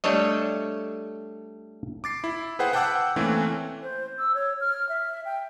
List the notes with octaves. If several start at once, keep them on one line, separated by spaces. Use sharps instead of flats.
G3 A3 D4 A4 C#5 D#5
D6 A6 C7
E4
G#4 B4 C5 F#5 G5
F#5 G5 A5 D6 E6 F#6
E3 A3 A#3 C4 C#4
C5
E6
C#5
F6
E5
G5